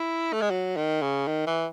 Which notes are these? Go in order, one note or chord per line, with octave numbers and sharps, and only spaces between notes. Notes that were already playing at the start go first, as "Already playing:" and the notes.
Already playing: E4
A3
G#3
F#3
D#3
C#3
D#3
E3